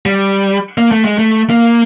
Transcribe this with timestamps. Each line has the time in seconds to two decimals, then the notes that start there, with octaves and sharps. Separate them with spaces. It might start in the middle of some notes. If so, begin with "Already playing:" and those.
0.06 G3
0.78 A#3
0.92 A3
1.05 G#3
1.19 A3
1.50 A#3